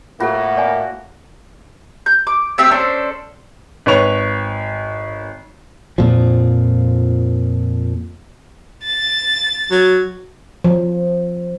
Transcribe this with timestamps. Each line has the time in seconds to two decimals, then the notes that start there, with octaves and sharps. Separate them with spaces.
0.20 A2 A#3 F4 F#4 A4
0.57 D5 G#5
2.06 G6
2.27 D6
2.58 A3 C4 G4 E5
2.71 C#4 D4 A4 C5
3.86 G#1 B4 C#5 C#6 F7
5.98 F2 A#2 F3
8.84 A6
9.71 F#3
10.64 F3